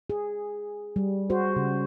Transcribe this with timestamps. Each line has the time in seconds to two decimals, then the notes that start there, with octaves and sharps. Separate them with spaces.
0.10 G#4
0.96 G3
1.30 F#4 G#4 C5
1.56 C#3